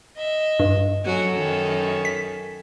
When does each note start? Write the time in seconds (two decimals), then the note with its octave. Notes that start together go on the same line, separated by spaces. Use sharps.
0.15 D#5 E5
0.59 G2
1.05 F#3 C#4 F#4 A4
1.34 F#2 D#3
2.05 B6